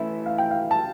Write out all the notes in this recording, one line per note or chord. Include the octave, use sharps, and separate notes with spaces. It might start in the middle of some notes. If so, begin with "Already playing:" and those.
Already playing: A2 E3 A3 C#4 E4 E5
F5
G5
F5
A5